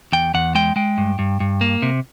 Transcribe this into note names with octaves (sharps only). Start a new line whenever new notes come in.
E2 G5
E2 F#5
G#3 G5
G#3 G5
G2
G2
G2
A#3
C3